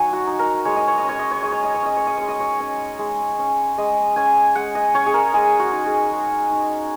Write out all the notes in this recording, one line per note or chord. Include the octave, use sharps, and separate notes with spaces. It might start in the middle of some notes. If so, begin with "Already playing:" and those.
Already playing: F#3 D#4 C#5 F#5 G#5
F#4
D#4
A#4
G#3 C#5
D#5
C#5
D#5
C#4 C#5
D#5
C#5
G#3 D#5
C#5
D#5
C#5
C#4 D#5
C#5
D#5
G#3 C#5
D#5
C#5
C#4
G#3
C#4
G#3 D#5
C#4 G#5
G#3 F#5
D#5
C#4 C#5
G#4
A#4
G#3 G#4
F#4
D#4
G#4
G#3
D#4